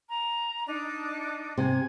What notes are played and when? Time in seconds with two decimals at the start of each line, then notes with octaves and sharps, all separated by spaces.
0.10 A#5
0.67 D4 D#4 D#5
1.58 C3 G#5